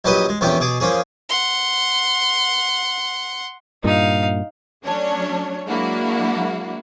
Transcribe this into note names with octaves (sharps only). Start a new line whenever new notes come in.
A#1 F#3 G4 B4 D#5 D#6
G#3
A#1 E2 B3 C#4 G4 G5
B2 G#4 D6
F3 A#3 C#4 G#4
F#5 C6
G2 A#2 D#4 F5
F#3 A3 C#4 D4 C#5
F#3 G#3 A#3 D4 E4 F#4